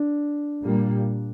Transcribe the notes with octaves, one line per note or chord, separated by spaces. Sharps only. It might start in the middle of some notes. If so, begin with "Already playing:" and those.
Already playing: D4
A#2 G3 A#3